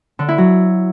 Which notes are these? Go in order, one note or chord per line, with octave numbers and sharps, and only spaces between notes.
D3
E4
F#3